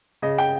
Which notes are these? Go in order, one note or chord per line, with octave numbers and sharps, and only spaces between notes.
C#3 D#5
G5